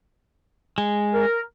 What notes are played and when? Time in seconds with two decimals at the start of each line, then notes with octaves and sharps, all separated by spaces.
0.78 G#3
1.14 A#4